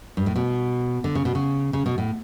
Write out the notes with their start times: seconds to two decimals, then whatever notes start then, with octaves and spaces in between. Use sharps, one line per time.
0.17 G2
0.26 A2
0.36 B2
1.04 D3
1.15 C#3
1.25 B2
1.35 C#3
1.73 C#3
1.86 B2
1.98 A2